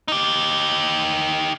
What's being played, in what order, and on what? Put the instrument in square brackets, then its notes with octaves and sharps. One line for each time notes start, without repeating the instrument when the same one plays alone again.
[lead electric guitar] D#4 G4